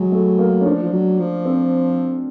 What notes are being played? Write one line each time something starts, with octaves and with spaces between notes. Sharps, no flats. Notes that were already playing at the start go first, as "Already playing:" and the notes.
Already playing: F#3 G#3
A3
A#3
C#4
F3 D4
F3
F#3
F3
C4